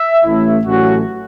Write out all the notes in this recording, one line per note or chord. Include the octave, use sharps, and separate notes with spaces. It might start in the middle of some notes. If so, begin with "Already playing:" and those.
Already playing: E5
A1 A2 A3 E4
A1 A2 F#3 A3 C#4 F#4